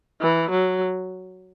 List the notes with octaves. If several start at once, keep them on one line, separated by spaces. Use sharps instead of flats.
E3
F#3